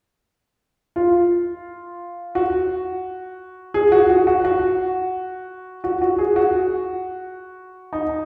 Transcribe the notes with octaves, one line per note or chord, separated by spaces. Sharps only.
F4
F#4
G#4
F#4
F#4
F#4
F#4
F#4
F#4
G#4
F#4
D#4